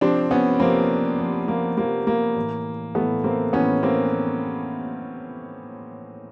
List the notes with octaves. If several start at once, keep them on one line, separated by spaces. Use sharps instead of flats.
C3 F3 C4 D4
B3 C#4
C3 F3 A#3 C4
C3 F3
A#3
C3 F3 A#3
A#3
A2 E3
A2 E3 A3 B3
A#3 C4
A2 E3 B3 C#4
A#3 C4